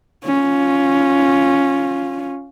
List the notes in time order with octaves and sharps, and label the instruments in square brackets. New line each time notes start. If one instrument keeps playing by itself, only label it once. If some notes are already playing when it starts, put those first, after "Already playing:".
[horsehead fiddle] C#4 F4